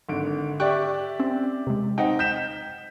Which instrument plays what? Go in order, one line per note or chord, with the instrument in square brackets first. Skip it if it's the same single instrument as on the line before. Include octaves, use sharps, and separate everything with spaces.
[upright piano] G#1 D3 D7
[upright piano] G4 D5 E5 [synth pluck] G5 C#6 F#6
[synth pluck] C4 C#4
C3 G#3
[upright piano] C4 D#4 [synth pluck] D#5 F#5 G5
[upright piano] G6 B6 E7